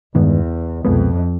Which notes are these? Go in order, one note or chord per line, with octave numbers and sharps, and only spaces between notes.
E2 G2 D#3 G#3 B3
C2 F2 B2 G#3 B3